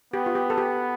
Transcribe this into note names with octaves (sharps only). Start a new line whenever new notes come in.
B3 G4
F4
G4
A4
G4